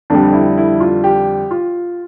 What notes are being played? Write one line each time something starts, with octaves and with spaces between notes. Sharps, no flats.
F2 D3 G3 D4
E4
E4
F4
G4
F4